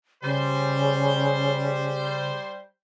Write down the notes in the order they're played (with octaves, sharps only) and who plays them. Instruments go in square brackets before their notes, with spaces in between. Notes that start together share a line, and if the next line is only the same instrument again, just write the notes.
[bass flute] C#3 [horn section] G3 C5